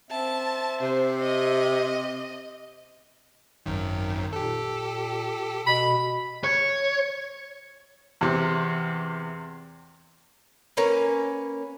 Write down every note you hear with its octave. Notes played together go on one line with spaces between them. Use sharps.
C4 E5 A5
C3 C5
D#5
G#1 F#2 D#3
A#2 G4 A4
B2 B5
C#5
E2 C3
A#3 C#4 B4